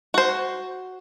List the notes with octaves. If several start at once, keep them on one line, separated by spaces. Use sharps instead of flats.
F#4 C5